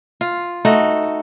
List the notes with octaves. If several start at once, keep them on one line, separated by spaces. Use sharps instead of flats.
F4
A3 D#4 F#4